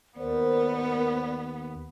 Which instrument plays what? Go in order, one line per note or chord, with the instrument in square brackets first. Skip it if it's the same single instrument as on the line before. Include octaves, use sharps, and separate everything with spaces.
[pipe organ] D#2 [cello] B3 [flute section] A#4 C5 D5